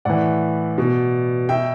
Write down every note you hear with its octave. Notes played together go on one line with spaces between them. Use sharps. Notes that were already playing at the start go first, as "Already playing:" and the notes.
A2 E3 D5 F#5
B2
B2 E5 G5